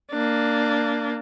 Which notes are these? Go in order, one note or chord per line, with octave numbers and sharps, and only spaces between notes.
A#3 D4